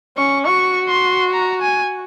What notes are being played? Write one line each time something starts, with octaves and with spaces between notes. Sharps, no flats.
C#4 C#6
F#4 C#6
C6
A#5
G#5